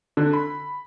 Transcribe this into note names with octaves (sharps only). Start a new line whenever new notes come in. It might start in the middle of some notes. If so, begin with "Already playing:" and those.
D3
B5